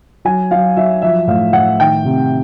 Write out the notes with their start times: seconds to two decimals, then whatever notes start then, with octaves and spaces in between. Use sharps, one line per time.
0.25 F#3 G#5
0.51 F#3 F5
0.76 F#3 E5
1.02 F3 E5
1.27 A2 F5
1.53 A2 F#5
1.79 D#3 G5
2.05 C3